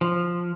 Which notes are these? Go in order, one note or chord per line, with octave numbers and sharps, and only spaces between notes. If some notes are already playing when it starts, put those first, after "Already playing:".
F3